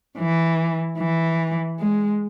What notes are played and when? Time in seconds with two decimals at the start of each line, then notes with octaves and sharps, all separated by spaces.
0.19 E3
0.99 E3
1.79 G#3